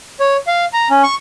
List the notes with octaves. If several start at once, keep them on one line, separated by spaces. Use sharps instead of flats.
C#5
F5
A#5
C#4
C#6